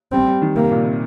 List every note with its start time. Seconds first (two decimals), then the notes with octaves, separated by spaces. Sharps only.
0.12 G3 C4
0.27 G3
0.42 D#3
0.56 C3 A#3
0.71 A#2
0.85 C3